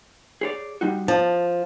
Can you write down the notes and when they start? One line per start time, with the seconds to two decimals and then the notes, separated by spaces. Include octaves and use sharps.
0.41 G#4 C#5 D5
0.81 G3 D#4 F#4
1.08 F3 A5